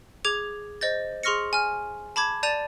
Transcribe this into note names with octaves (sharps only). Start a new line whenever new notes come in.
G#4 D6 G#6 F7
C5 D#5 G6 A6
G#4 C6 C#6 F6 A#6 C#7
G#5 F6
A5 B5 D6 G#6
D5 A5 G6 A6 D#7 F7